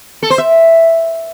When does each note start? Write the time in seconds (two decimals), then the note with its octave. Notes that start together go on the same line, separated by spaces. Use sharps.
0.23 A4
0.30 C5
0.38 E5